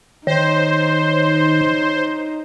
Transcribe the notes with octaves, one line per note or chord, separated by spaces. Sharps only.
D#3 D#4 C5 C#5